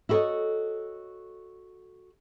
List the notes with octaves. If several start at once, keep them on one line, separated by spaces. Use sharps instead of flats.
E4 F#4 A4 A#4 C#5 D#5